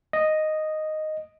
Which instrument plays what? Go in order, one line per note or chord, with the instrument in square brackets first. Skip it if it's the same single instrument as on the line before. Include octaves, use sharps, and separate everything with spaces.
[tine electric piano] D#5